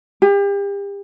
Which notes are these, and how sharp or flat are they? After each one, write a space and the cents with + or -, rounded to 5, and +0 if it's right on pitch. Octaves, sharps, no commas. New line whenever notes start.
G4 +35